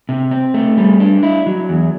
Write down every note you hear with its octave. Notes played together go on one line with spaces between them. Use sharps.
C3
C4
A3
G3
D4
E4
F#3
E2